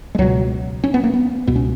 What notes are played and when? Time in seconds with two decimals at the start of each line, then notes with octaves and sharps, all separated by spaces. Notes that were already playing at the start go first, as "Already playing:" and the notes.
0.15 G#3
0.18 C#2 B2 F#3
0.84 C#4
0.94 B3
1.04 A#3
1.14 B3
1.47 C#2 B2 B3
1.56 C#4